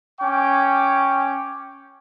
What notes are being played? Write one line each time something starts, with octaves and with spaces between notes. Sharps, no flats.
C#4 G5 D6